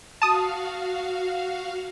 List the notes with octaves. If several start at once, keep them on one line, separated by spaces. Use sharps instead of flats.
F#4 F5 A5 D#6